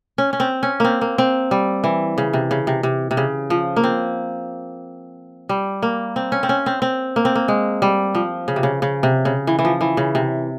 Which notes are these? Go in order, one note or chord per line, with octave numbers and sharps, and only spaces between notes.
C#4
C#4
C4
C#4
A#3 C4
A#3
C4
G3
E3
C#3
C3
C#3
C3
C3
C3
C#3
F3
A#3
C4
G3
A#3
C4
C#4
C4
C#4
C4
C4
A#3
C4
A#3
G#3
G3
F3
C#3
C3
C#3
C#3
C3
C#3
E3
E3
F3
E3
C#3
C3